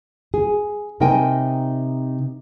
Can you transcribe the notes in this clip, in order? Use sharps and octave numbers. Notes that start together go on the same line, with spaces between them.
G#4
C3 D#4 A#4 G5 G#5